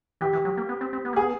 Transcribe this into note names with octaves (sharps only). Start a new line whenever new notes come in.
E3 G4
E3
F#3
A#3
B3
C4
C4
B3
A#3
G#4
B3